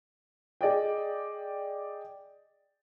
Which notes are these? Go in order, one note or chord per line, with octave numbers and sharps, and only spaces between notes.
G#4 D5 D#5 G5